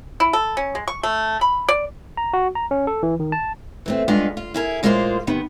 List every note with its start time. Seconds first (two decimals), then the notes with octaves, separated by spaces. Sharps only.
0.20 E4
0.33 A4
0.57 C#4
0.75 G#3
0.88 C#6
1.03 A3
1.41 B5
1.69 D5
2.17 A#5
2.34 F#4
2.55 A#5
2.71 C#4
2.87 A4
3.03 E3
3.20 D#3
3.32 A5
3.86 E3 A3 C4
4.08 G2 G#3 B3 D4 F4 D#5
4.37 F4
4.54 E4 G#4 A#4
4.83 A#2 G#3 A#3 F4 B4 C5
5.27 C3 D#3 B3